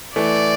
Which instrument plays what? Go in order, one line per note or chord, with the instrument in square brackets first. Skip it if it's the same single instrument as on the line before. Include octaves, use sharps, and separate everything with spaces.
[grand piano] E3 A3 [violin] D5